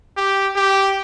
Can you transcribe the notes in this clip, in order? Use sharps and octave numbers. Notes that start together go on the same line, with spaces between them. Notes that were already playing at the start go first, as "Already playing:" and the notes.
G4
G4